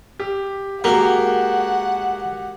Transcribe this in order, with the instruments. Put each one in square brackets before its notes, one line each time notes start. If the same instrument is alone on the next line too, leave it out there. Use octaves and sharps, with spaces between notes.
[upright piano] G4
[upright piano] G#3 F#4 G4 [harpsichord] A#3 [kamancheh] F#5